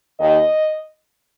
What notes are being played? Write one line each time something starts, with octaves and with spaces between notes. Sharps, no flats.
D#2 D#3 D#5